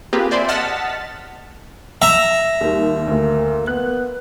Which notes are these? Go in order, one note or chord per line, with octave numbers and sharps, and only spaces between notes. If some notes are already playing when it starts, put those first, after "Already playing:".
A#3 C4 F4 G4 G#4 B4
C5 D5 E5 G#5 C6
D#5 F#5 A5 F6 A6 B6
E5 A#5
D#2 D#3 G3
D2 A#3
B3 F#6